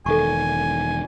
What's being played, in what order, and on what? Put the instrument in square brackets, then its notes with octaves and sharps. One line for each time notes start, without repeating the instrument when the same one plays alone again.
[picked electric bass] E1 D#3 [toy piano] A4 C#6 [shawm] G#5